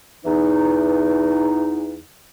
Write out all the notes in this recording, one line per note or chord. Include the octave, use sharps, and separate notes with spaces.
E2 E3 D#4